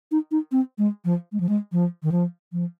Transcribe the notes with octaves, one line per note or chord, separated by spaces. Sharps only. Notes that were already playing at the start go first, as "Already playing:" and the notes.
D#4
D#4
C4
G#3
F3
G#3
F3
G#3
F3
D#3
F3
F3